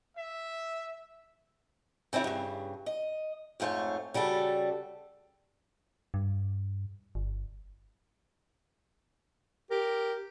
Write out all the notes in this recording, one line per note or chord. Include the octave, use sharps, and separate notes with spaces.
E5
C#3 C4 D4 E4 C#5
G2 C#3
D#5
F2 G#2 A3 C5 C#5
C#3 G3 F#4 A4
G2
G1
G4 A#4